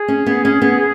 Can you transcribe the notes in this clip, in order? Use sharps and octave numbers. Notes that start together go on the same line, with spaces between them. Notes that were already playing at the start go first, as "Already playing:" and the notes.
Already playing: G#4
C#4
B3
C#4
B3